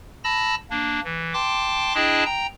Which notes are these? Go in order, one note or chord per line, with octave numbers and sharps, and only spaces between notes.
A5 B5 E6 A#6
A#3 D4
E3
G5 A5 C6 D6
D4 E4 G#4 D#5 G5 A5
G5 A#5